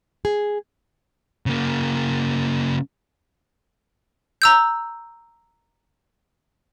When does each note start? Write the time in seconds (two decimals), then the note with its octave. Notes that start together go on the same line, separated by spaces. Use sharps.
0.25 G#4
1.46 C#3 A#3
4.42 A#5 E6 G6